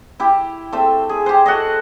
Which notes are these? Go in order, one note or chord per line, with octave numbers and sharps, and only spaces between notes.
E4 G4
A3 C4 E5
G#4
G4 C5
F#4 A4 D#5